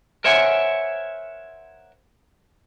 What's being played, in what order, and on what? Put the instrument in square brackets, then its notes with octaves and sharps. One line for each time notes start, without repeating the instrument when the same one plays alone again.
[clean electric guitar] A#4 C5 C#5 E5 F#5 G#5